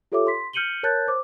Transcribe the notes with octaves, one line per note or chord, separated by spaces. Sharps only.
F4 G4 A4 C#5 E5 D6
C6 B6
F6 G6 C#7 D#7 F#7 G7
A#4 C#5 A5 F#6 G6 A6
C5 D6